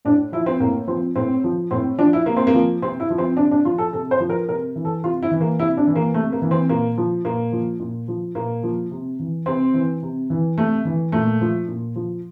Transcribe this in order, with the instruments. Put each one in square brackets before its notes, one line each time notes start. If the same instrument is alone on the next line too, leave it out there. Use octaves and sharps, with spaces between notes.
[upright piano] A2 D4
F3 E4
C4
A2 A#3
F3 C4
A2 C4
F3
A2 C4
F3 D4
E4
C3 A#3
C4
A#3
F3
C3 C4
E4
F3
C4
C3 D4
D4
F3 F4
A4
C3 A4
C5
F3
A#4
C3 A#4
E3
A4
C3 F4
E4
E3
A#3
C3 E4
D4
E3
A#3
C3 A3
A#3
E3
C4
A#2 A#3
F3
A#2 A#3
F3
A#2
F3
A#2 A#3
F3
C3
E3
C3 C4
E3
C3
E3
C3 A3
E3
A#2 A3
F3
A#2
F3